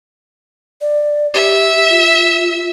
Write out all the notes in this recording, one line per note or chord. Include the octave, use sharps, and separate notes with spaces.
D5
G4 E5
F4